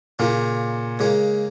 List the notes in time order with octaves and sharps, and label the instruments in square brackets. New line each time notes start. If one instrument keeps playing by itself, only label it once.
[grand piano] A#2 [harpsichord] C#3 A#3 C#4
[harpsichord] C#3 A#3 C#4 [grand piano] G#3